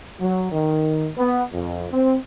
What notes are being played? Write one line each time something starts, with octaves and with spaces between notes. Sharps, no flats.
F#3
D#3
B3
F2
C4